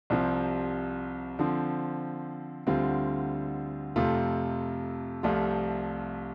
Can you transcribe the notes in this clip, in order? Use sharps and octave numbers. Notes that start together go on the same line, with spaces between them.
C2 C3 F3 C4
D3 F3 C4
D2 D3 G3 C4 F4
F2 C3 A3 F4
C2 C3 F3 A3 F4